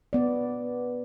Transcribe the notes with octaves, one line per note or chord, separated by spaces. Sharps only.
B3 D5